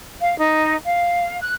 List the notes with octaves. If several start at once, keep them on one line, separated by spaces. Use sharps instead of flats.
F5
D#4
F5
F#6